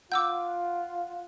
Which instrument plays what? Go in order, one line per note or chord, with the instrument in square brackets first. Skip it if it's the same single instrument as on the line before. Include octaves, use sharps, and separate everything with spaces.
[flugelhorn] F4 [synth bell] F#5 F#6 [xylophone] D6 E6 G6